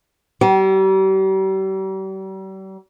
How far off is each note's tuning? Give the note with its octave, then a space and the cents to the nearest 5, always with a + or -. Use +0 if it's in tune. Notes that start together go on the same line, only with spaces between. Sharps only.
G3 -40